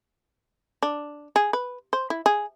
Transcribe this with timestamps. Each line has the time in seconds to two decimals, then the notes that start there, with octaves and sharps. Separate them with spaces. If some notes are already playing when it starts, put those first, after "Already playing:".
0.83 D4
1.36 G#4
1.53 B4
1.93 C5
2.10 E4
2.26 G#4